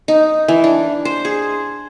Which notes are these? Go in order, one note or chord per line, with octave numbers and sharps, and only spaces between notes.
D#4
E3
D4
C5
G#4